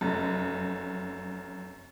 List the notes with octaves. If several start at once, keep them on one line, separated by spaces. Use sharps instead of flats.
F1 F#2